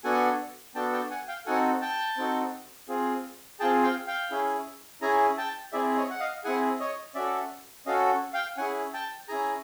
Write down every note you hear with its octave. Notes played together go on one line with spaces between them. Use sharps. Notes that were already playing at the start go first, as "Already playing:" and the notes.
B3 D4 F#4 A4 F#5 G#5
B3 D4 F#4 A4 G5 A5
G5 A5
F#5 G#5
F5 G5
C4 D#4 F#4 A4 F#5 G#5
G5 A5
C4 D#4 F#4 A4
C4 F4 G#4
C4 F4 G#4 G5 A5
F5 G5
F5 G5
C#4 E4 G#4
C#4 E4 G#4 G#5 A#5
G5 A5
C4 E4 G#4 D5 E5
C#5 D#5
F#5
D#5 F5
C4 E4 G#4 F#5 G#5
C#5 D#5
C#4 F#4 A4 D5 E5
C#4 F#4 A4 D#5 F5
F5 G5
C#4 E4 G#4 F#5 G#5
G5 A5
C#4 E4 G#4 G#5 A#5